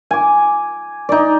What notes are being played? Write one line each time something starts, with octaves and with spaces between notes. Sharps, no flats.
G#5 D6
D#4 D5